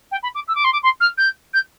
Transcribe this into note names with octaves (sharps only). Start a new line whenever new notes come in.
G5
B5
D6
E6
D6
C6
D6
C6
F6
G6
G6